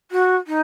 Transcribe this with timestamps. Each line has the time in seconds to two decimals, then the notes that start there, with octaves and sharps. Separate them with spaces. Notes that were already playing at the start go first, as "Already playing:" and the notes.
0.11 F#4
0.47 D#4